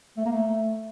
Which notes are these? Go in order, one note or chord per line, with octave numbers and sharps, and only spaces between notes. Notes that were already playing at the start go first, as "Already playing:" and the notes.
A3
A#3
A3